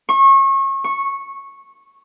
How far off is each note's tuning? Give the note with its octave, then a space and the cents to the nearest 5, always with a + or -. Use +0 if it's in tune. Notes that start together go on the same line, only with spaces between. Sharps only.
C#6 -30
C#6 -10